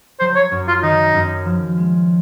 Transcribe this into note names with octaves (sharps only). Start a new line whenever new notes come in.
F#3 C5
C#5
F#2
F4
D#3 D#4
F#2
F3
G#3